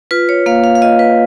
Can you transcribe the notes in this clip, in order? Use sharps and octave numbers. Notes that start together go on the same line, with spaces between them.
F4 B4
C#5
A#3 F5
F5
F5
F4 D#5
B4